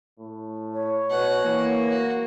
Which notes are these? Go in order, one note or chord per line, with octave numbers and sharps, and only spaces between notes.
A2
C#5
B2 F#5
E3 A#3
F#4